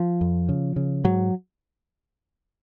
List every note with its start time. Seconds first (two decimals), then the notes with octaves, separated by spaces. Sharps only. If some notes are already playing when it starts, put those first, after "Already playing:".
Already playing: F3
0.21 F2
0.49 C#3
0.76 C#3
1.04 G#2 F#3